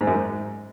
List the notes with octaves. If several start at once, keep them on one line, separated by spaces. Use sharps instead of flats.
G#2
F#2
G#2